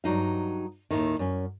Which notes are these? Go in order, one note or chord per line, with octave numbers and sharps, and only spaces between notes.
G2 F#3 D#4 F5
D#2 A2 D#3
F#2 C#4